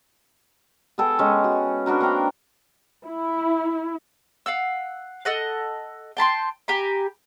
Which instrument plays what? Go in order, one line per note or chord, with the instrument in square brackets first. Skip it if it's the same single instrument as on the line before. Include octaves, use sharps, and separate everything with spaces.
[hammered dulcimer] B3 G#4 A4 G5
G#3 C#4
F#4
B3 D4 F#4 A#4
A#3 C4 A#4 G5
[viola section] E4
[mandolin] F5 F#5 E6
A4 D#5 F#5
G5 A5 B5 C6
G4 G#5 A#5 B5